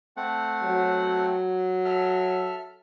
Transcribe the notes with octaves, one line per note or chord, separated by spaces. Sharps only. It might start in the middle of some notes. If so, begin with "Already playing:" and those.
A3 C4 F#5
F#3
A4 E5 F6